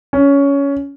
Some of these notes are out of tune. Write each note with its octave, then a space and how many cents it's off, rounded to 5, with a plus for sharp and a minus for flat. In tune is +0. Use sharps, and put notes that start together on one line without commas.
C#4 +15